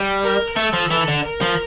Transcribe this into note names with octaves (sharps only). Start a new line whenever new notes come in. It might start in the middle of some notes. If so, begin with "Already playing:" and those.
Already playing: G3
A#4
A3 A4
F3
E3 A4
D3
A#4
F3